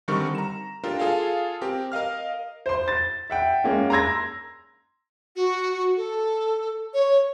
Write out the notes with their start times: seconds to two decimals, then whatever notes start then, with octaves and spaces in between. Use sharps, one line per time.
0.08 D3 D#3 G3 C4 A#4 C#6
0.35 A#5 E7
0.84 D4 F4 G4 A4 A#4
0.99 F4 G#4 A4 F5
1.61 C4 G4 A#4
1.92 A#4 D#5 F5 F6
2.66 C5 C6
2.88 A6
3.30 E5 F#5 G5
3.64 G#3 A#3 C#4
3.90 A#5 C6 E6 G#6 A#6
5.36 F#4
5.97 A4
6.94 C#5